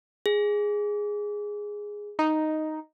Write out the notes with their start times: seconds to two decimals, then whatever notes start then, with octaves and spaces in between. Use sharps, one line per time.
0.26 G#4
2.19 D#4